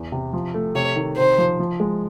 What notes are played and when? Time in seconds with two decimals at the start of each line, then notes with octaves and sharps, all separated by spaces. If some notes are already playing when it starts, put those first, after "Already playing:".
Already playing: E2
0.12 C3
0.33 F3
0.54 A3
0.75 C3 C#5
0.96 D#3
1.17 C3 C5
1.38 F3
1.59 F3
1.80 G#3